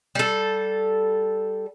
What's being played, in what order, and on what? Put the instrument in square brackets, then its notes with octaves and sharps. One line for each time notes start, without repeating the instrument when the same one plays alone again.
[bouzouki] G3 A4